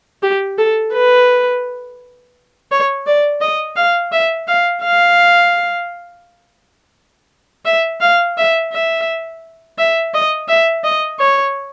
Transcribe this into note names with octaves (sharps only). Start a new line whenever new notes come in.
G4
A4
B4
C#5
D5
D#5
F5
E5
F5
F5
E5
F5
E5
E5
E5
D#5
E5
D#5
C#5